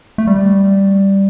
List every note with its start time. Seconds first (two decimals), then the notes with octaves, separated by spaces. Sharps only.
0.18 A3
0.27 G3